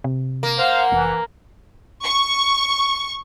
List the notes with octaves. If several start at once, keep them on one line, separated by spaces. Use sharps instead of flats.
C3
A#3
C5 F5 F#5
F1 E3
C#6